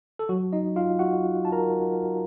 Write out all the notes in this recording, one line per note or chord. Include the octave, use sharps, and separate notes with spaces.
A4
F#3 F#4
D#4 D#5
F4 F5
F#4 F#5
A5
A#4 A#5